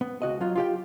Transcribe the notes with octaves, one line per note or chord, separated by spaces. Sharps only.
B3
C#2 F#4 D#5
F#3 F4
F4 G4 G5